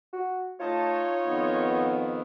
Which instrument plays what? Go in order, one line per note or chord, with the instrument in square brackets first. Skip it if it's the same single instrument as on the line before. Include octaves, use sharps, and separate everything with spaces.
[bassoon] F#4
[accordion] A3 A5 [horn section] D#4 C#5 [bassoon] F4
[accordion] F2 D#3 B3